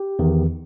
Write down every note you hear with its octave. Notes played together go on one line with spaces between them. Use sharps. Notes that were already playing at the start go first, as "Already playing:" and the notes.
Already playing: G4
E2 D#3